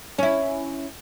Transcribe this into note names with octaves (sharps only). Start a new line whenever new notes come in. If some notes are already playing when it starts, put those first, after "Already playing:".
C#4 E4